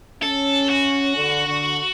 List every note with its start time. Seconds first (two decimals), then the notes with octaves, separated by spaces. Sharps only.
0.22 C#4 A4
0.69 F#4
1.16 D3
1.47 D3